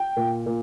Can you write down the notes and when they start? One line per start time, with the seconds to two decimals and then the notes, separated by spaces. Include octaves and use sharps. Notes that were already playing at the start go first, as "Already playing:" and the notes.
Already playing: G5
0.17 A#2
0.46 A#2